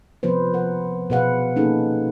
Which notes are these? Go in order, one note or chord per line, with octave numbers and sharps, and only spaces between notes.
C3 F3 B3 B4 C5
A#4 F#5
B2 G#4 B4 F5 F#5
A#3 C#4 D#4 G#4 A4